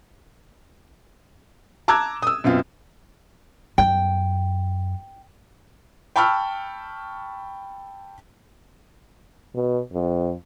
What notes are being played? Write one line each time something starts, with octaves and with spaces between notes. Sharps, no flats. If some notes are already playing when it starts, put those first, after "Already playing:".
A5 A#5 D6 E6 F#6 G#6
D#6 E6
F#2 B2 C4 F4
F#2 G5
G5 A5 B5 C#6 E6 F6
B2
F2